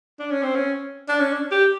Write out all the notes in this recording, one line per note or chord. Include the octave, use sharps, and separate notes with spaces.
D4
C#4
C4
C#4
D4
C#4
D4
G4